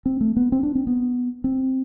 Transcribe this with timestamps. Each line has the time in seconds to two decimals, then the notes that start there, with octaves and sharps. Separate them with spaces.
0.06 C4
0.21 A3
0.37 B3
0.52 C4
0.63 D4
0.75 C4
0.87 B3
1.44 C4